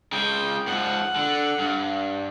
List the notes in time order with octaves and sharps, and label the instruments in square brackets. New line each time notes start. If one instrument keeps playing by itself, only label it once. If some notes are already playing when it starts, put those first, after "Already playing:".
[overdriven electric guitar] C#3 G#3 [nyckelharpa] G5
[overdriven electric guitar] G#2 F3 [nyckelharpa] F#5
[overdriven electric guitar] D3
G2